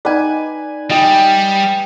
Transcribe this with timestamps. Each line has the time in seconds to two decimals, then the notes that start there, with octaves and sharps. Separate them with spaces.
0.05 D#4 B4 D5 G#5
0.90 G3 D#5 G5 G#5